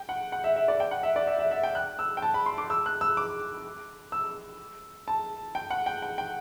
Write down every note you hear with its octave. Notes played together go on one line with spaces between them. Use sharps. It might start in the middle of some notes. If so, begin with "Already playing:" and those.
Already playing: G5
F#5
F#5
E5
E5
D5
G5
F#5
E5
D5
E5
E5
E5
G5
F#6
E6
G5
A5
B5
C6
D6
E6
F#6
E6
D6
E6
A5
G5
F#5
G5
G5
G5